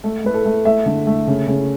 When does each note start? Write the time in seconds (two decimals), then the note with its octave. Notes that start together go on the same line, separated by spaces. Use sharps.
0.04 A3 A4
0.24 A3 B4
0.34 A4
0.45 A3
0.65 A3 E5
0.86 D3
1.07 A3
1.27 C#3
1.47 C#3